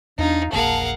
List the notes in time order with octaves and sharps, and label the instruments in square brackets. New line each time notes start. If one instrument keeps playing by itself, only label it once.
[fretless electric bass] E2 [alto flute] D4 [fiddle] D#4 F4
[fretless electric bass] E1 A#1 A#3 [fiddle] G#4 A#4 [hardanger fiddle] F5 F#5 [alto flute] A5